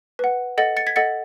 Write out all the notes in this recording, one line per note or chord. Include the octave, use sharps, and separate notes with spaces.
B4 F#5
A4 D#5 F#5 A6 C#7
A6 C#7
G#6 B6
A4 D#5 F#5 A6 C#7